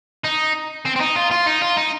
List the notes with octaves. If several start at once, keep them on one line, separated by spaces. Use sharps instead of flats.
D#4
C4
C4
D#4
F4
F4
D#4
F4
D#4